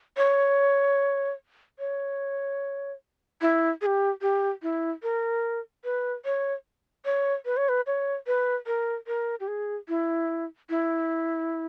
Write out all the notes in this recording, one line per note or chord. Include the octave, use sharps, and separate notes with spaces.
C#5
C#5
E4
G#4
G4
G4
E4
A#4
B4
C#5
C#5
B4
C#5
B4
C#5
B4
A#4
A#4
G4
G#4
E4
E4